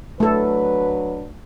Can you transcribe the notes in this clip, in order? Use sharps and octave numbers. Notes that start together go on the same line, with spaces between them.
F#3 A3 D4 A4 B4